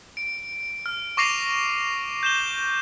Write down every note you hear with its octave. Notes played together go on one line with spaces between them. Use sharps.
D7
F6
C#6 D6 A#6 C7 D#7 F7
G6 E7 G7